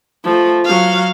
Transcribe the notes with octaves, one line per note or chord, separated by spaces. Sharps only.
F3 A3
F#3 F5